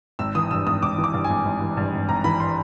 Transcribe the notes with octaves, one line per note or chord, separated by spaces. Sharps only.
G#1 E6
E3 D#6
G2 E6
G#1 D#6
G#1 D6
E3
D6
G2
G#5
G#1
G#1
E3
G2
G#1
G#1 A#5
E3 B5
C6